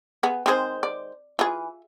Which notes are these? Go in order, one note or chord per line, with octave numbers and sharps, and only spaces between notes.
B3 G#4
D#3 G#3 C4 G#4 C5
D5
E3 F4 G#4